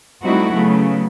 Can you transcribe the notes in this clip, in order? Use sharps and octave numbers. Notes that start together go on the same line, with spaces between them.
G3 A3 C4 D#4 E4 F#4
C#3 F#3 A3 B3